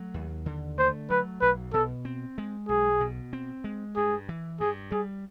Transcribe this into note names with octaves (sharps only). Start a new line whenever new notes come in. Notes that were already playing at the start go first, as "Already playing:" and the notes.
Already playing: F#3 A3
D#2
D3
A3 C5
F#3 B4
B1 B4
B2 A4
C4
G#3
B1 G#4
B2
C4
G#3
G2 G#4
E3
G2 G#4
G3 G#4